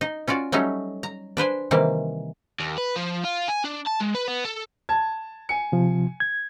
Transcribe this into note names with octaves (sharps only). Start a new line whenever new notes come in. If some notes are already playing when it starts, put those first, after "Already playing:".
D#4
C#4 F4 F#4 D5
F#3 G3 A3 C#4 D#4
A#5
D4 B4 C5 G#5
C3 D#3 E3 G3 A#3
D#2
B4
F3
F4
G#5
D4
A5
G#3
B4
B3
A4
A5 G#6
G#5 C#7
C3 F3
G#6